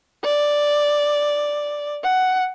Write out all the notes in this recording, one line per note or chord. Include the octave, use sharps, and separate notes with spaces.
D5
F#5